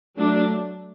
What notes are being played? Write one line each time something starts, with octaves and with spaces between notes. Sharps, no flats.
F#3 A3 D4